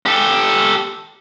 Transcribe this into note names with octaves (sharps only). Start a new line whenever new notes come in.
G4 A4